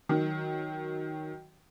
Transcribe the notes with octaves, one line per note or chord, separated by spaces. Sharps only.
D#3 F#3